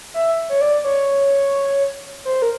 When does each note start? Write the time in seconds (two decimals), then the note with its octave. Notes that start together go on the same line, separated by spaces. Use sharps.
0.14 E5
0.49 C#5
0.61 D5
0.85 C#5
2.25 C5
2.42 A#4